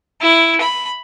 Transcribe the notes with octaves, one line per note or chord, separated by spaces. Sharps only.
E4
B5